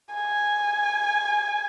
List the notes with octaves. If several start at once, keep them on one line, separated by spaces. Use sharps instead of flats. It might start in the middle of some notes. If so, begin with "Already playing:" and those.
G#5